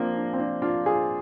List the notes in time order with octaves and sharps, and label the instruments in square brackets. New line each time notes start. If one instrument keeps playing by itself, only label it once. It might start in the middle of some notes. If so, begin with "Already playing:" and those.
Already playing: [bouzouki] F3 A#3 [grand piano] C4 D4
[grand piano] D4
C4
D4
D4 F4
F4 G#4